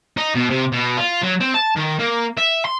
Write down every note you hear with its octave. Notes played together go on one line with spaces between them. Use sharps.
D#4
B2
C3
B2
F4
F#3
C4
A5
D#3
A#3
E5
C6